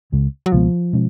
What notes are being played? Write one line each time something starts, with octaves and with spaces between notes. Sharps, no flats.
C#2 C#3 G#3
F#3
C#2 B2 F3 G#3 B3
B2 G#3 C#4